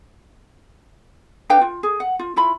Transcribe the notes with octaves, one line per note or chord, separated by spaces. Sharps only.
D4 B4 F5 G5
F4
G#4
F#5
F4
E4 F4 B5